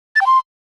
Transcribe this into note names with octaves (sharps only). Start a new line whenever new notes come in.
A6
G5
C6